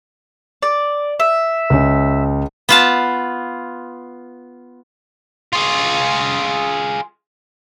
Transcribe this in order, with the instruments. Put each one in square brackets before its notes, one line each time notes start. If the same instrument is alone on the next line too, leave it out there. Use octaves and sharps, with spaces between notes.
[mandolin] D5
E5
[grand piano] C#2 C#4
[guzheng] B3 F4 A5
[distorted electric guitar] F4 G#4